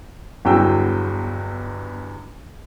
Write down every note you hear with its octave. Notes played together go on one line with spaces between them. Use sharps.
G1 E2 F#3 F#4 G5 E6